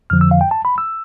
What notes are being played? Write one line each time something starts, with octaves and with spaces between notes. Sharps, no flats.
F2 D3 F3 F6
E6
F5
G5
A5
B5
E6